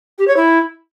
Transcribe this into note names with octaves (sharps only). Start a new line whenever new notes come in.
G4
C#5
E4